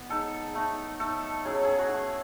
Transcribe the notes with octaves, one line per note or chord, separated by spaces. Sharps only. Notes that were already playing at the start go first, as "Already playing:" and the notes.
Already playing: B3
G#3 D#4 A4
A3 D#4
A3 D#4 A4
F#3 C#4 E4 G#4
A4
G#4
F#4
A3 E4 G#4